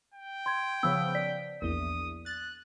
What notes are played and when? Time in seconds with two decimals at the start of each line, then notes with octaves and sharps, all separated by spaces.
0.14 G5
0.46 C6 G#6
0.83 C#3 F3 B3 E6
1.15 D5 B6
1.62 A#1 E2 D#6
2.26 F#6 A6